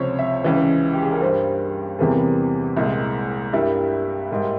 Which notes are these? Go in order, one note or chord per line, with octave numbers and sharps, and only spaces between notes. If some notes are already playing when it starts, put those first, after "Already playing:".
Already playing: C#2 C3 F3 C5 C#5
E5
C#2 C#3 E3
G4
G#4
A#4
G2 G3 A#3 C5
E2 C3 E3 G3 A#3 G#4
C2 A#2 G#3 E4
G2 G3 A#3 E4
G#2 G3 A#3